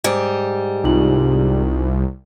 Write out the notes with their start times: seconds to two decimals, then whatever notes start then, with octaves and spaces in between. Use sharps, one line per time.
0.04 G#2 G3
0.84 C2 D#4 F4 F#7